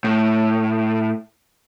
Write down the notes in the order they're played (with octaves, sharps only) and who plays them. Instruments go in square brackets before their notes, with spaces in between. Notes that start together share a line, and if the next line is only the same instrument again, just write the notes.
[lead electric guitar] A2